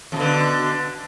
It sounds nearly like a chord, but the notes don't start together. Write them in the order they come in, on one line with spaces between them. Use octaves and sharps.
F2 B2 D3